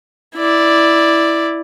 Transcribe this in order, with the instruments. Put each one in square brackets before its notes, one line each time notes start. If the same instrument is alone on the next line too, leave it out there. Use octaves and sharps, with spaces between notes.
[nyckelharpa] E4 D5